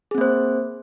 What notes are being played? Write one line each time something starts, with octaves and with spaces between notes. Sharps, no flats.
A#3 C4 G#4 C5